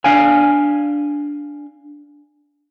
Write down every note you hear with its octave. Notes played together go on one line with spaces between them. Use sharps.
D4 F5 G#5